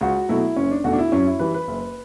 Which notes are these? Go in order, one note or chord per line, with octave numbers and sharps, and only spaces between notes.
C#2 F#4
B2 F#3 A3 E4
F#1 C#4
D4
E2 B2 A3 F#4
D4
E4
F#2 C#4
E4
E3 G3 B4
B4
F#1